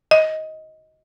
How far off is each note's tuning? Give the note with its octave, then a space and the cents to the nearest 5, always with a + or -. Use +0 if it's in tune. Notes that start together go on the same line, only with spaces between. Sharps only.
D#5 +15